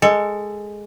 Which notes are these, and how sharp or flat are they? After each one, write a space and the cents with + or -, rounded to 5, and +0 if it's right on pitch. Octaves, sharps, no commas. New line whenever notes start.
G#3 +0 A4 +15